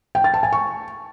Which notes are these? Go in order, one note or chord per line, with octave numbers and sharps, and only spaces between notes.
G5
A6
A5
G#5
C#6